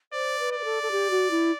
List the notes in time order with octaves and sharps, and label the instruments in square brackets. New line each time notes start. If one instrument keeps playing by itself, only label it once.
[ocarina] C5 [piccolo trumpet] D5
[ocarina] B4
[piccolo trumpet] D5
[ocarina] B4
A4
A4
G4
F#4
E4